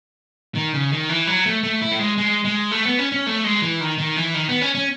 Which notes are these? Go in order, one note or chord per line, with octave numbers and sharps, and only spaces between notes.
D#3
C#3
D#3
E3
F#3
A3
A3
E4
A3
G#3
G#3
G#3
A3
B3
C#4
C#4
A3
G#3
E3
D#3
D#3
E3
D#3
B3
C#4
C#4